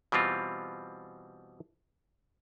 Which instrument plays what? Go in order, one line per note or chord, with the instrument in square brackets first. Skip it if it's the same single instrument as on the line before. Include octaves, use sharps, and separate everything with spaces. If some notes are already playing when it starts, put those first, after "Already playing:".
[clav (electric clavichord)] B2 E3 G3 C4 F4